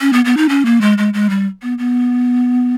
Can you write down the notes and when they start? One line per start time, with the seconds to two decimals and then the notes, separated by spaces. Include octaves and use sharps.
0.01 C#4
0.13 B3
0.25 B3
0.37 D#4
0.49 C#4
0.65 A#3
0.81 G#3
0.98 G#3
1.14 G#3
1.30 G3
1.62 B3
1.78 B3